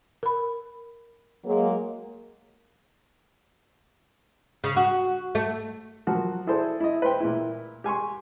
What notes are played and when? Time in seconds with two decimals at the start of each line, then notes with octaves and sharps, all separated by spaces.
0.23 A#4 B5
1.44 F#3 G#3 A#3
4.64 C#3
4.77 F#4
5.35 A3
6.07 F3 F#3 A#3 F#4
6.47 E4 G#4 A4 C5 D5
6.80 E4 D#5
7.02 B4 C5 G5
7.20 A#2 E4
7.84 G4 G#5 C6 C#6